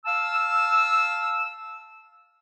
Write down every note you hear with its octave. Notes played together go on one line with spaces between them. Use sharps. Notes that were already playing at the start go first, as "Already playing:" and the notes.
F5 A5 E6